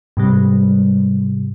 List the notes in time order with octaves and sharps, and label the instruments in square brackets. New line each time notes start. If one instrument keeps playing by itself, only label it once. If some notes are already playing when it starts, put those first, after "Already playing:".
[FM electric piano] G#2 C3 G3